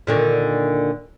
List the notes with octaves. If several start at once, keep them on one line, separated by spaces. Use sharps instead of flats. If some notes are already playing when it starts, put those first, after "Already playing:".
A#2 D3 D#3